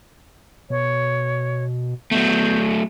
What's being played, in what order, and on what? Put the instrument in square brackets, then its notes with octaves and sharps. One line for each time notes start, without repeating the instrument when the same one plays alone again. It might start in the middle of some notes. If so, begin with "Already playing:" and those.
[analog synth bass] B2 [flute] C#5
[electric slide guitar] F#3 A3 [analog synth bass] B3 [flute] G6